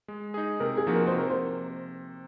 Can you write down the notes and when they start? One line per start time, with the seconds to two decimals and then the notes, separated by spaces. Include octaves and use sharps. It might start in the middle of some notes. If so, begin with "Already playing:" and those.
0.08 G#3
0.34 D#4 G#4
0.60 C3 A#4
0.77 G#4
0.87 F3 A#3 D#4 F#4
0.95 A#4
1.07 C5
1.13 C3
1.18 A#4
1.30 C5